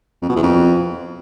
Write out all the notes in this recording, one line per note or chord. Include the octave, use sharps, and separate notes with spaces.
F2
B2
E2
F2